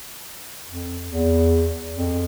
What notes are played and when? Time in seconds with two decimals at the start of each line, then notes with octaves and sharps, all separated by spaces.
0.68 F2
1.09 E2
1.95 F2